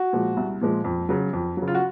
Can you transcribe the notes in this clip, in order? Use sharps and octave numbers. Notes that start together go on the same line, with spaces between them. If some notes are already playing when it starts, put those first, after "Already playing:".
Already playing: F#4
A#2 F3 G#3
C2
A#2 F3 G#3
F2
C#3 F#3
F2
F#3
C#3
F4
F#4